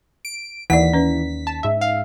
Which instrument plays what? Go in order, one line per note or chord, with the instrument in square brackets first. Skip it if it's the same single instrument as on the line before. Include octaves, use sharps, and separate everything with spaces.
[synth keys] D7
[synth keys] D#2 B6 [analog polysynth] E3 [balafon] D5 F#5
[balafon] C#4 B4
[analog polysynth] A5
G#2 E5
[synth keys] F5